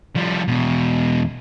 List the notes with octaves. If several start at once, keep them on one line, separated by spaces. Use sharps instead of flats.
F3 G3
E2 B2